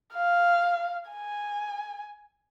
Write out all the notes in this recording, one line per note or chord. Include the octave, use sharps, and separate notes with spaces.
F5
G#5